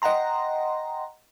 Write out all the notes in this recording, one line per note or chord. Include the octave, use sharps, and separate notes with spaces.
D#5 F#5 G5 A#5 C6